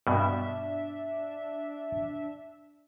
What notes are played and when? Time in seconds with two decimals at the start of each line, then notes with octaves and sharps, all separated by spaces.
0.07 G2 B2 D4 E5